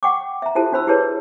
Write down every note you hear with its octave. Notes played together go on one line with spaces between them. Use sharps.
F#5 G5 C#6 D6
E5 A#5
E4 F4 G4 A4 C5 A5
D4 F#4 C5 B5 E6
E4 G4 G#4 B4 C#5 A5